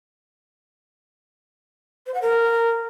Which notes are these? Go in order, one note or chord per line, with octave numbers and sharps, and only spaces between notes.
C5
F#5
A#4